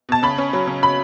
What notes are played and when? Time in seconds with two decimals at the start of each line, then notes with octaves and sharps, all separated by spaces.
0.09 B2 A5
0.23 C#3 B5
0.38 C#4
0.53 F#3
0.67 C#3
0.82 C#3 B5